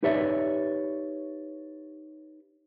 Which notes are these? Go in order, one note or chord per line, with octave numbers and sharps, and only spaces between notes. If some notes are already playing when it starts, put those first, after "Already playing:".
D#4 G4 B4 C#5 D5 E5